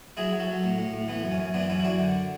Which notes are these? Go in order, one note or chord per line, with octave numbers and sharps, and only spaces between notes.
F#3 E4 G#4
F#3
F#4 A4
F#3
A2
A2
A2
E3 B3
F#2
C#4
F#2
E3 B3 D4
F#2 C#4 E4
E4
F#2 D4 F#4
D3